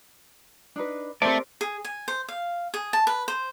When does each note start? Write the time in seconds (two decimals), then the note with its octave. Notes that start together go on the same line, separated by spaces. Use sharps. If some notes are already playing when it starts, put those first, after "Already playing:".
0.76 D4 D#4 B4
1.22 A3 C4 G4 A#4 C5 D5
1.61 G#4
1.85 G#5
2.08 C5
2.29 F5
2.74 G#4
2.93 A5
3.07 B4
3.28 C5